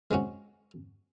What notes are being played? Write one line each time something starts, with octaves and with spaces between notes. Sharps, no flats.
G#3 C4 C#4 F#4